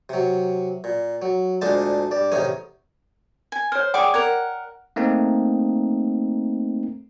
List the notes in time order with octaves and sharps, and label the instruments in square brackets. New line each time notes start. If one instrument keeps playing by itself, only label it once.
[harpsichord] C3 F#3
A#2
F#3
D2 A#2 G#3 D4 C5 A5
G2 D5
A1 E2 C3 C#4 D#4 G#5
[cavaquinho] G#5
[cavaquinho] C5 [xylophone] C#5 F6
[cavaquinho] G#4 C#6 D6 [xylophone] D5 F#5 G5
[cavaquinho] A#4 F#5 [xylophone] G#6 F7
[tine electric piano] A3 A#3 C4 D#4